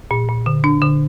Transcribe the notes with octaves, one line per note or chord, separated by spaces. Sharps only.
A#2
A#2
D3
D4
D3